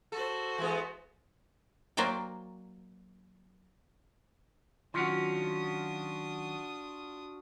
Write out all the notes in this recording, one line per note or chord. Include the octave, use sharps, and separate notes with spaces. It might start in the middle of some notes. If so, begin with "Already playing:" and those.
F#4 A4 C5
E3 G#3 B3
F#3 A#3 F#4 C5 D5 G5
D#3 F#3 C#4 D4 F4 F#4 D#6